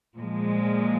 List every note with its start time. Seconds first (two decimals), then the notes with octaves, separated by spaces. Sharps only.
0.16 A#2 F3 G#3